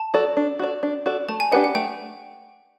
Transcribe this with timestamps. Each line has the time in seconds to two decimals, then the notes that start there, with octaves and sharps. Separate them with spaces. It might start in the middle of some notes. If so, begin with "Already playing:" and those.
Already playing: A5
0.14 F#4 A4 D5
0.37 D4
0.59 F#4 A4 D5
0.83 D4
1.06 F#4 A4 D5
1.28 A3 A5
1.40 G#5
1.52 D4 G4 B4 D#5 F#5
1.64 F#5
1.75 A3 G5